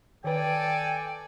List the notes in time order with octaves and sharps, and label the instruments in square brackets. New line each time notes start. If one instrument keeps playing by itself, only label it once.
[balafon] D#3 B4 [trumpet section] A4 D5 G#5 [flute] G5